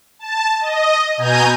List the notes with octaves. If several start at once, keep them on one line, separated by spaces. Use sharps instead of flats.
A5
D#5
B2 G#5 A#5 G6 D#7